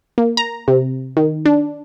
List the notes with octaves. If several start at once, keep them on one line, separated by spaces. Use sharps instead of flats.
A#3
A#5
C3
D#3
D4